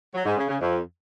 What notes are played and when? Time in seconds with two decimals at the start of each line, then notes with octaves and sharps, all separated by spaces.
0.14 F#3
0.25 G#2
0.37 C#3
0.49 C#3
0.60 F2